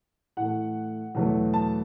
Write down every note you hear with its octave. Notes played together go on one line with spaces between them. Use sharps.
A2 E3 A3 F#5
E2 B2 F#3 A3
A5